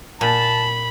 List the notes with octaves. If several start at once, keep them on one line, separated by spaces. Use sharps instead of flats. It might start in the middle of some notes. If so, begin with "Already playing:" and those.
A#2 A5 B5